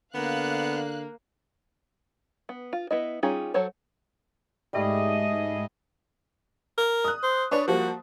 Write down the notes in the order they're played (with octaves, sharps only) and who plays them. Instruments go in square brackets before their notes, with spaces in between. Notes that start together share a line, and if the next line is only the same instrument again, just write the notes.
[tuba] D3 [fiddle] A#3 [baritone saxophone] B3 [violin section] F5 F#6
[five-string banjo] B3
F4
B3 E4 D#5
G3 C#4 D#4 F4 G#4
F#3 A4 C5 C#5
[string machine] G#2 [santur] G3 A3 F#4 [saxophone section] G#4 D#5
[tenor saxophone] A#4
[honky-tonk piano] D#6 F#6
[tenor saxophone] C5
[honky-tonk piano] D4 B4 D5 [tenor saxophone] C#5
[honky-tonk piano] F3 G3 A#3 [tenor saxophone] F#4